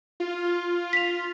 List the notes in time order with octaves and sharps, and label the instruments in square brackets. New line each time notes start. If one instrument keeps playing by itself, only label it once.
[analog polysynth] F4
[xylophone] B6 F7